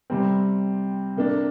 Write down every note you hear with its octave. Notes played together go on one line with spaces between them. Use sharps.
C3 G3 C4
C3 A#3 D4